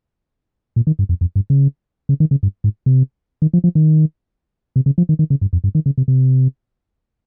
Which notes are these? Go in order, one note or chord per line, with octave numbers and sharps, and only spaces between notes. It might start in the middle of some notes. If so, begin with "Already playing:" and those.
A#2
D#3
G2
F2
F2
G2
C#3
C#3
D#3
C#3
G2
G#2
C3
D#3
F3
F3
D#3
C3
C#3
F3
D#3
D#3
C#3
G2
F2
G2
D#3
C#3
C3
C3